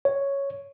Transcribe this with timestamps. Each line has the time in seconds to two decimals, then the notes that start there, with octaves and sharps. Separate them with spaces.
0.05 C#5